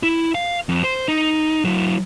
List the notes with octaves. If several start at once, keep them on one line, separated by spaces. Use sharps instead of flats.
E4
F5
F2
C5
D#4
F#3 E4